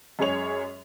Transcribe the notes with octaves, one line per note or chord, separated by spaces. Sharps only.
F#2 G#3 G#4 C#5 F7